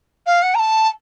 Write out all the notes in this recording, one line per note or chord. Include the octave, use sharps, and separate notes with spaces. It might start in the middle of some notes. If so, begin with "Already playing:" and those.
F5
F#5
A#5
A5